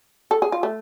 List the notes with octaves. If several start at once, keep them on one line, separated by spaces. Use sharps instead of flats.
A4
G#4
F4
A3